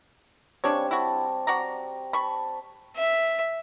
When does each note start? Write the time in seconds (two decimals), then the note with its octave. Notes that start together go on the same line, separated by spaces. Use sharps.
0.64 C#3 G3 C4 D4 C#5 D6
0.91 E4 F#4 A5
1.47 F#4 D5 A#5
2.13 A5 B5 C#6
2.96 E5